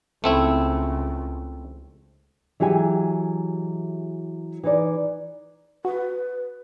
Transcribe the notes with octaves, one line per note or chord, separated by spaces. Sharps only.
C#2 A3 C4 E4
E3 F#3 G#3 G4 G#5
E3 D#4 D5
F#4 B4